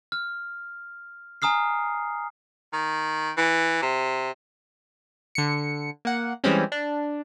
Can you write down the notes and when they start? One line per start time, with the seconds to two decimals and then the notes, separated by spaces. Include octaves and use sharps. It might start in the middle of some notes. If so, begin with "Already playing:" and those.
0.12 F6
1.42 G#5 A#5 D#6 F6 C7
2.73 D#3
3.37 E3
3.82 C3
5.35 D3 C#7
6.05 A#3 F#5
6.44 E3 G3 G#3 C4 C#4
6.72 D4